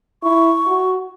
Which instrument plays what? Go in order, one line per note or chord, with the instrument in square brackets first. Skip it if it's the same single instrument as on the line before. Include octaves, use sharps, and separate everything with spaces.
[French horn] E4 [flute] C#6
[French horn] F#4